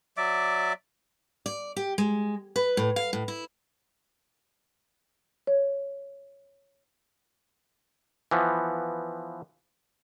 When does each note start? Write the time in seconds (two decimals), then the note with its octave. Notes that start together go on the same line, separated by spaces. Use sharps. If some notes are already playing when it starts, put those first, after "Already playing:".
0.17 F#3 D5 E5 D6
1.46 D5
1.76 G4
1.98 G#3
2.56 B4
2.77 A2
2.96 F5
3.13 A2
3.28 E4
5.47 C#5
8.31 E3 F3 B3